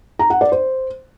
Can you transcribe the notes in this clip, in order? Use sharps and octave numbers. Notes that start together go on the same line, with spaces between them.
A#5
F#5
D5
C5